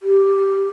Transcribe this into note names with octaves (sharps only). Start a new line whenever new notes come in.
G4